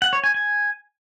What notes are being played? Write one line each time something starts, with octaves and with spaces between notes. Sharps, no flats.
F#5
C#5
G#5
G#5